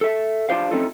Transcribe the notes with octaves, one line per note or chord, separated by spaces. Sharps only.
A4 E5
D4 F4 G4 C5 F5
A3 C4 C#4 D#4 F4 A4